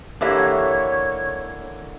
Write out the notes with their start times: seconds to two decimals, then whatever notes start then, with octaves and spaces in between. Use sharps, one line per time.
0.21 D3 E3 A#3 G4 A4 C#5 E5